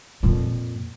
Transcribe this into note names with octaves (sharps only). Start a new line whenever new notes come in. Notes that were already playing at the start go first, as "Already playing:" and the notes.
F2 A#2